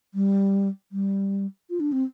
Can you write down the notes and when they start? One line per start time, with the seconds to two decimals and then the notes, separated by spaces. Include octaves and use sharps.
0.14 G3
0.92 G3
1.70 F4
1.80 D4
1.92 C4